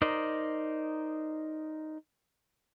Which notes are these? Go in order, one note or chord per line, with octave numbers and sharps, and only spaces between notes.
D#4 A#4 C5 D5 D#5